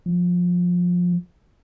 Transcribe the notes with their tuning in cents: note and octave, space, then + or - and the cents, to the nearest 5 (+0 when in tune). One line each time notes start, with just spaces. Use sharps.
F3 +20